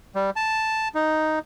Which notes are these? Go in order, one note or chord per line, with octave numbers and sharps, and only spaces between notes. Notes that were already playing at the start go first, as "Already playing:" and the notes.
G3
A5
D#4